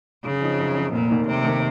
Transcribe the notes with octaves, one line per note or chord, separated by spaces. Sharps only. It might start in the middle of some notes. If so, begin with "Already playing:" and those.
F#2 C#3
F3 C4 D#4
F#2
F3 C4 D#4
F1 A#2
D#2 D#3 A#3
F1 C3
D#2 D#3 A#3